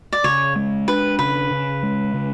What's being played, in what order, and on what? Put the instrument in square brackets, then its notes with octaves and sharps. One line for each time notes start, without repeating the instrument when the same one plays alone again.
[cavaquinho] D5
[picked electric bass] C#3 [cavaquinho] C#5
[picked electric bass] G#3
[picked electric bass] D4 [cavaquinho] B4
[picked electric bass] C#3 [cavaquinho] B4
[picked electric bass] C#3
G#3
C#3